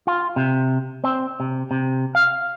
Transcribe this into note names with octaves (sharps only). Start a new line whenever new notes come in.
F4
C3
C4
C3
C3
F5